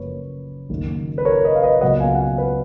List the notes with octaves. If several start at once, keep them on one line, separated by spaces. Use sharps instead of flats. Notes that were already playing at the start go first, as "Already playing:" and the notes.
Already playing: F#1 F#2 F3 A#3 B4 C#5
F#1 F#2 D#3 A#3
B4
A#4 C#5
B4 D#5
F5
B4 D#5
C#2 B2 F#3 A#3 D#5 F#5
F5 G#5
F#5
F5 G#5
B4